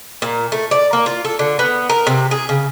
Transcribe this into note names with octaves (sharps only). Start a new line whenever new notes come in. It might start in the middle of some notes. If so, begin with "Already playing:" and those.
A#2
A3
D5
A#3
F4
A4
D3
B3
A#4
C3
G#4
C#3